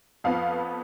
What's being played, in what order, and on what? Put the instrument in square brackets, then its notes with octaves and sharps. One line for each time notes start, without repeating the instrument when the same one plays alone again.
[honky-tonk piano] F2 F3 B3 F5